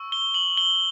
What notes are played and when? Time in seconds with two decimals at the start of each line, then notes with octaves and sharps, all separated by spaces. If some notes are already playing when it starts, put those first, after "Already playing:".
Already playing: C#6 E6
0.12 G7
0.34 F#7
0.57 G7